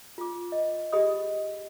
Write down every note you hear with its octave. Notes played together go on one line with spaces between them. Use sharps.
F4 D6
D#5
G4 G#4 D#5 B5 D#6